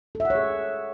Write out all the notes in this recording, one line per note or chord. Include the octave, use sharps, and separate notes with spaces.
A4
E5
F#5
C#5
G#4